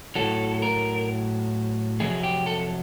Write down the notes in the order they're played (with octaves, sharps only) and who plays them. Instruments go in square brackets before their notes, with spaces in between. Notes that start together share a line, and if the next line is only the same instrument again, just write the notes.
[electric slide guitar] A2 F#3 A4
A#4
F2 C3 F#3 G#4
G4
A4